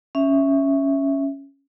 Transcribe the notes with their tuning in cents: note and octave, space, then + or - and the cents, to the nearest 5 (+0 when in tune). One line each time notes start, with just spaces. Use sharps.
C#4 +0 E5 +0